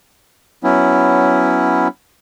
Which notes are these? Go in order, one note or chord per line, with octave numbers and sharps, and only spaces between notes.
F#3 B3 C#4 E4